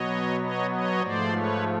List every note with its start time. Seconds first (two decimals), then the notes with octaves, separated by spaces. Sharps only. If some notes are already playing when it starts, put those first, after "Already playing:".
Already playing: B2 F#3 B3 C#5 D#5
0.41 C#5 D#5
0.71 C#5 D#5
1.02 G#2 F3 A3 C5 D5
1.32 B4 C#5